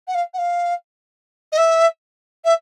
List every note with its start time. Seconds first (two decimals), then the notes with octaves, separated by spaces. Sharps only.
0.07 F#5
0.14 F5
0.33 F#5
0.38 F5
1.52 D#5
1.57 E5
2.44 E5